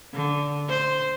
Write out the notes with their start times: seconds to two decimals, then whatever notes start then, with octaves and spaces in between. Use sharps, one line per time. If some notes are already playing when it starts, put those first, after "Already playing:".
0.14 D3
0.69 C5